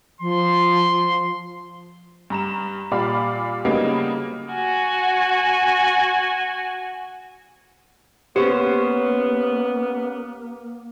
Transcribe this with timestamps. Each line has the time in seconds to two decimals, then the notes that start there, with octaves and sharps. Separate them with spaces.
0.21 F3 C6
2.30 G2 A#5 E7
2.91 A#2 G3 D5 F5 B5
3.65 C#3 F#3 G3 A#3 B3 D#4
4.53 F#4 G#5
8.36 A#3 B3 C#4 G4 C5